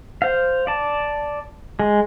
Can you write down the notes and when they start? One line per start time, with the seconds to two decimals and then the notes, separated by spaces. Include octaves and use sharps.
0.22 C5 F5
0.67 D5 A5
1.80 G#3